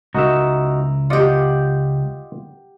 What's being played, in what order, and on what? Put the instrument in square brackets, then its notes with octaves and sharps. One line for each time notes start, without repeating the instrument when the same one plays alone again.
[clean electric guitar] C#2 A#4 E5 [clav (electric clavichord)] D#4 F#4
[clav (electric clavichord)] F4 D5 D#5 [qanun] G4 F#5